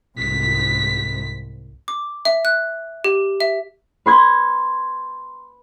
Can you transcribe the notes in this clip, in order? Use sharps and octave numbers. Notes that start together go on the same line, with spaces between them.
C2 G#2 B6
D6
E5
F#6
G4
E5
B4 C6 G#6